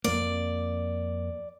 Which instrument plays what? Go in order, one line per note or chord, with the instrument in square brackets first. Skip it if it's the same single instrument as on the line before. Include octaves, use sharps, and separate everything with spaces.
[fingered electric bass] F2 A#3 [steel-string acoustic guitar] D5